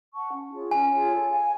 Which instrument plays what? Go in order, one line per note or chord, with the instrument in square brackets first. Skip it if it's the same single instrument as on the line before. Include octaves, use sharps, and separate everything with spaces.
[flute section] F#5 A5 C#6
C#4
F4 G#4 C#5
[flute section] C#4 [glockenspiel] G#5
[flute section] F4 G#4 C#5
A4
F5 G#5